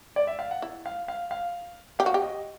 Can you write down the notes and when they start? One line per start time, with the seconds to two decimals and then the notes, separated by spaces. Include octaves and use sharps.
0.16 D5
0.27 E5
0.39 F5
0.51 F#5
0.62 E4
0.86 F5
1.08 F5
1.31 F5
1.99 G4 F5
2.06 F#4
2.14 G4
2.22 D#5